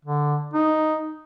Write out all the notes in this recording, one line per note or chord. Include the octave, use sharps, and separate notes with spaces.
D3
D#4